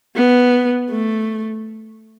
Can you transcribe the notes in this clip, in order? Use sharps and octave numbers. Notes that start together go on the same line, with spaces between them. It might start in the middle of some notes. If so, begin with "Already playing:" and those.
B3
A3